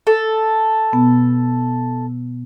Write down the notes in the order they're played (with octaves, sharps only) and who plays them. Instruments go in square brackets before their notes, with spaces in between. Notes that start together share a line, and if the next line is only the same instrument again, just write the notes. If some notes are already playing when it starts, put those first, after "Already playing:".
[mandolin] A4
[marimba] B2 B3